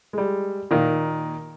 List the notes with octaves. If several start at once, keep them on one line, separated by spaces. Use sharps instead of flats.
G3 G#3
A#2 D#3 A#3